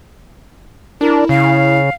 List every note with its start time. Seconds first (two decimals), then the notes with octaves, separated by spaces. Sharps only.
1.01 D4 E4 A#4
1.29 C#3 F5